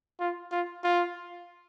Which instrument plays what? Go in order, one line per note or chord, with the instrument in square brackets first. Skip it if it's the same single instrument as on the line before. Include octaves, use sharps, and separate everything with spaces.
[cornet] F4
F4
F4